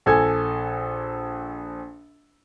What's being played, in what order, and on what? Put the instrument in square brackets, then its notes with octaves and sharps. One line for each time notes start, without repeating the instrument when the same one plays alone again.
[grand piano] A#1 A4 G#5 G#6